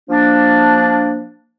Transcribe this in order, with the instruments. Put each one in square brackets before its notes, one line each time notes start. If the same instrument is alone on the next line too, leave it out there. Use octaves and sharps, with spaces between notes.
[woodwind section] F3 A#3 D4